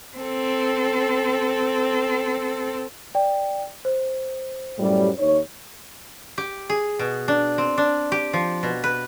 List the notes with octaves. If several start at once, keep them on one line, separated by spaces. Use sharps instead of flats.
C4 A4
D5 G5
C5
F#2 A2 G3
D#2 D#4 C#5
G4
G#4
B2
D4
C4
D4
G4
F3
B2
B4